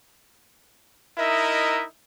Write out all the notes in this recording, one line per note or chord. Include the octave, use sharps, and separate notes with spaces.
D#4 E4 A#4 D#5 E5